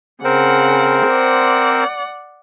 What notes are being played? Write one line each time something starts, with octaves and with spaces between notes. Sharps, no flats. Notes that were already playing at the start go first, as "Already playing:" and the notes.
C#3 C4 A#4 C5 F#5
D5 F#5